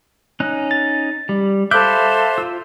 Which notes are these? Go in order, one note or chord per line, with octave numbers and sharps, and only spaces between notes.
C#4 D#4 F#6
A6
G3
A4 C5 E5 F5 B5 D6 F#6 G6
F4 E6